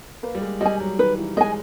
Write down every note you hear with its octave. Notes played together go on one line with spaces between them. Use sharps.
A#3 B4
G3
G#3
G3 D#5 G#5
F#3
D#3 B4
E3
G#3 D#5 G#5